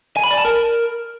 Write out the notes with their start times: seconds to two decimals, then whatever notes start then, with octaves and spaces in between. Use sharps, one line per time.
0.16 G#5
0.24 B5
0.31 D5
0.38 A5
0.45 A#4